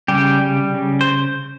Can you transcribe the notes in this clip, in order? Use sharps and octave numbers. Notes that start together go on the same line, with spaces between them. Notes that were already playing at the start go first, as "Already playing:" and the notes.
C#3 G3 G4
G3
C#3
C5